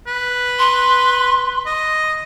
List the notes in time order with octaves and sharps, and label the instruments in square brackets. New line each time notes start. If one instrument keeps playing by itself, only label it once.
[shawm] B4
[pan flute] C6
[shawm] D#5